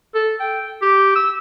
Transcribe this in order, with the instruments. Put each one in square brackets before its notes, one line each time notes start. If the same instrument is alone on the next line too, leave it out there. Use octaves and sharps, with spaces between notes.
[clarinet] A4
G5
G4
E6